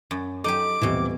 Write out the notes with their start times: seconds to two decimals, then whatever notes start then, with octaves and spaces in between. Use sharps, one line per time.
0.11 F#2
0.44 F#3 D#4 G4 A4 D6
0.82 D#1 B2 E3 C4 G4